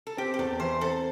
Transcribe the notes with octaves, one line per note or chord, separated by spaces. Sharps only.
A4
C4 G4
G4
E2 A4
E3 C5
C4 A4